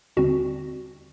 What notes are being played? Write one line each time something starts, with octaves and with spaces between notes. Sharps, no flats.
D#2 D3 G3 C4 F#4